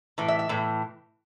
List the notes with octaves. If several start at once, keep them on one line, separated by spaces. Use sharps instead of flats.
A2 E3
E5
E5
A2 E3